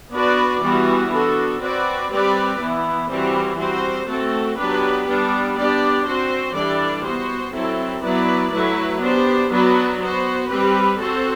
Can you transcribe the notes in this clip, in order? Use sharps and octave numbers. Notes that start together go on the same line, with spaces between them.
B3 D4 F#4 B4 D5
E3 G3 B3 F#4
B3 D4 F#4 A4
C4 F#4 B4 D5
G3 C4 G4 B4 D5
E3 B3 E4
E3 G3 C4 F#4 C5
G3 C4 F#4 C5
A3 C4 F#4 A4
F#3 B3 D4 G4 B4
G3 B3 D4
B3 D4 G4 D5
C4 F#4 C5
E3 G3 D4 A4 D5
B3 F#4 C5
F#3 C4 E4 A4
F#3 B3 E4 B4 D5
F#3 A3 E4 B4
B3 D4 G4 C5
F#3 B3 D4 F#4 B4
B3 F#4 C5
G3 C4 G4 B4
C4 F#4 A4 C5